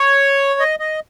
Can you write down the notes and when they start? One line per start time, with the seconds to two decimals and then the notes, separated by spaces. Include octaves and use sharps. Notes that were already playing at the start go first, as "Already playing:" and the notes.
Already playing: C#5
0.60 D#5
0.79 D#5